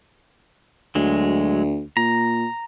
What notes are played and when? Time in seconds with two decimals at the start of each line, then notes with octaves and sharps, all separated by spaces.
0.95 D2 F#3 G#3
1.97 A#2 A#5